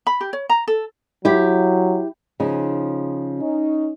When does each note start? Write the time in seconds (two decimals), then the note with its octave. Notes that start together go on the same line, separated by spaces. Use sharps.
0.07 B5
0.21 G4
0.33 C#5
0.49 A#5
0.67 A4
1.25 F#3 E4 G4
2.40 C#3 F3 D#4
3.40 C#4 D#4